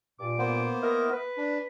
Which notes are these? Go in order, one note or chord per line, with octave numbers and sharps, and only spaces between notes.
G2 A#2 D6
A#3 B3 C5
E4 A#4 D#5
B4
D4